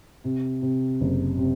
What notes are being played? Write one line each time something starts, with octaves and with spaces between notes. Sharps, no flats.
C3
C3
F#1
C3